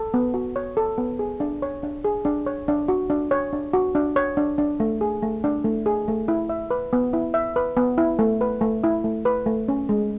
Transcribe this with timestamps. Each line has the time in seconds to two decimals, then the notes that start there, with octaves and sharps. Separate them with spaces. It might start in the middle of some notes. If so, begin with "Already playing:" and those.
Already playing: A4
0.14 B3
0.34 F#4
0.56 C#5
0.77 A4
0.98 B3
1.19 G#4
1.40 D4
1.62 C#5
1.83 D4
2.05 G#4
2.25 D4
2.46 C#5
2.68 D4
2.88 F#4
3.10 D4
3.31 C#5
3.53 D4
3.73 F#4
3.95 D4
4.16 C#5
4.37 D4
4.58 D4
4.80 A3
5.01 G#4
5.22 A3
5.44 D4
5.65 A3
5.86 G#4
6.08 A3
6.28 E4
6.49 E5
6.71 B4
6.93 B3
7.13 E4
7.34 E5
7.56 B4
7.77 B3
7.98 E4
8.19 A3
8.41 B4
8.61 A3
8.84 E4
9.04 A3
9.25 B4
9.46 A3
9.68 C#4
9.89 G#3